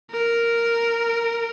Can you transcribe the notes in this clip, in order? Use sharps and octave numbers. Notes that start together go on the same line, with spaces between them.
A#4